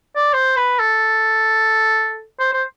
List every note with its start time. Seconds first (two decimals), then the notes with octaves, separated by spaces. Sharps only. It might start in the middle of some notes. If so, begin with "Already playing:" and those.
0.16 D5
0.33 C5
0.56 B4
0.79 A4
2.40 C5
2.53 C5